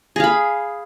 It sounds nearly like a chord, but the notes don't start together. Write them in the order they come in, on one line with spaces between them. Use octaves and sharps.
G#4 F5 B5